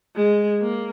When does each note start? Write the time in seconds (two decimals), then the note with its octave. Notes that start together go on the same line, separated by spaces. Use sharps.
0.16 G#3
0.62 A#3